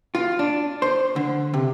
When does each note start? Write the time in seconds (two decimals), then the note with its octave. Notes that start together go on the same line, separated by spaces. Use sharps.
0.15 F4
0.39 D4
0.82 C5
1.16 D3
1.54 C3